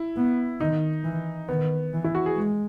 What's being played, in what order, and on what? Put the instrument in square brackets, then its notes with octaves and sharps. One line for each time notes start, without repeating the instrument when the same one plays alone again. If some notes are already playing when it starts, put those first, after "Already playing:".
Already playing: [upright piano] E4
[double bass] B3
[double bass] D#3 [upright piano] D#4
[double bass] E3
[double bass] D#3 [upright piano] B3
[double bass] E3
[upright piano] E4
F#4
G#4
[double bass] G#3